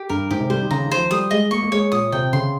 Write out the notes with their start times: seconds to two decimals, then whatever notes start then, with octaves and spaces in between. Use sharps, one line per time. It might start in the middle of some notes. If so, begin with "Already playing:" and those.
Already playing: G4
0.09 G2 A#4
0.31 G#2 G4
0.40 C3
0.50 G3 C5
0.61 D#3
0.71 C#3 A#5
0.85 D#3
0.91 C5
0.97 F3
1.11 G3 D#6
1.31 G#3 D#5
1.51 A#3 C#6
1.62 A#3
1.71 G#3 C#5
1.92 A#2 D#6
2.12 C3 G5
2.33 C#3 C6